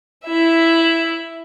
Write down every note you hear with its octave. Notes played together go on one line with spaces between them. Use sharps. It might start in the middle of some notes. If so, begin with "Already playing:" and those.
E4 E5